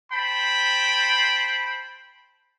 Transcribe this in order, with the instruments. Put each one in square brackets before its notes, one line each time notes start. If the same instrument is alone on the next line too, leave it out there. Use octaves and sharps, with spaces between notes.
[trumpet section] C5 G5 A5 B5